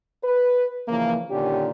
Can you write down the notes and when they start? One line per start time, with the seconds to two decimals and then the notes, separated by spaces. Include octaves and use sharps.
0.24 B4
0.88 C#3 E3 F3 A#3
1.31 A#2 D3 D#3 C#4 G4